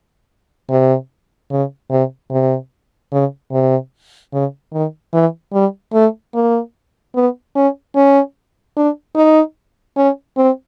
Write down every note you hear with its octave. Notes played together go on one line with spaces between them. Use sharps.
C3
C#3
C3
C3
C#3
C3
C#3
D#3
E3
G3
A3
A#3
B3
C#4
C#4
D4
D#4
C#4
C4